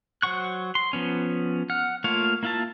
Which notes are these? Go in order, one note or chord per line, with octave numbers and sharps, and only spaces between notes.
F#3 C5 F#5 C#6 F#6
C6
F3 B3 C#4
F#5 F6
A3 A#3 F4 C#5 F5
A#3 E4 F4 E5 A5